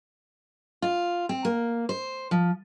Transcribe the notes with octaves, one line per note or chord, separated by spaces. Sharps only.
F4
C4
A#3
C5
F3